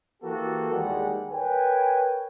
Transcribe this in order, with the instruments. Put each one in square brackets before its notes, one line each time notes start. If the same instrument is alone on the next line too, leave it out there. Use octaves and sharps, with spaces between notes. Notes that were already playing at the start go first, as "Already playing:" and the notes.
[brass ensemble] E3 A#3 F#4 G4 A4
D#2 G3 G#3 G#4 F#5
A#4 B4 C#5 G5 G#5